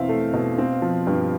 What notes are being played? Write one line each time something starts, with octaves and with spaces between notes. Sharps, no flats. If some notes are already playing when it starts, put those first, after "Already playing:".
Already playing: E2 B2 C4 E5 F5
A3
B2
C4
F3
G2